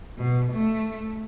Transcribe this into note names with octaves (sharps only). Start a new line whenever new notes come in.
B2
A3